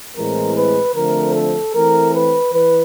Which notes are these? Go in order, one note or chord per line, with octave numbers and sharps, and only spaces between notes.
A2 E3 G#3 C4 A#4
B4
D3 F3 A3 C4 A#4
A4
E3 A3 C4 A#4
B4
E3 B4